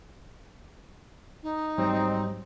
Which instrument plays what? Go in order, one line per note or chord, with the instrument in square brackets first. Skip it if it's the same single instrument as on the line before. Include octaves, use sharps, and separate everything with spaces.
[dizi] D#4
[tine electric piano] G#2 F#3 G3 [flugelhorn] C4